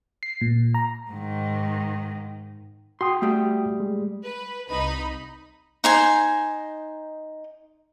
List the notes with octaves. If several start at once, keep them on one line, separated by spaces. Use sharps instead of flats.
C7
A#2
A#5
G#2 D#3
F#4 G5 C6 D#6
G3 A3
G#3
B4
C2 D#4 B5
D#4 C5 G#5